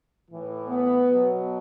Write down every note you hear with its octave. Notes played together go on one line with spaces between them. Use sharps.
A2 E3
B3
B2 F#3